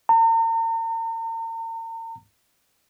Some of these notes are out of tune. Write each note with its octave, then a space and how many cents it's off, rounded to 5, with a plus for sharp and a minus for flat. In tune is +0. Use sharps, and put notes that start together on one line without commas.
A#5 -45